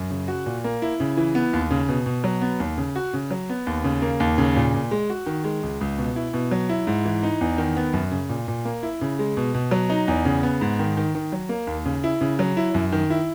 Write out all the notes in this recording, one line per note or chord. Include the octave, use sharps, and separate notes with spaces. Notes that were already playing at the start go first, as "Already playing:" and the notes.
Already playing: F#2
C#3
F#4
A#2
A#3
E4
C#3
E3
B3
D#2
C#3
B2
B2
F#3
B3
D#2
C#3
F#4
C#3
F#3
B3
D#2
C#3
A#3
D#2
C#3
A#2
A#2
G#3
F#4
D#3
G#3
C#2
C#2
B2
E4
B2
F#3
E4
G#2
E3
D#4
E2
D#3
B3
F#2
C#3
A#2
A#2
A#3
E4
C#3
G#3
B2
B2
F#3
D#4
E2
C#3
B3
G#2
D#3
D#3
D#3
F#3
A#3
D#2
C#3
E4
C#3
F#3
E4
F#2
D#3
E4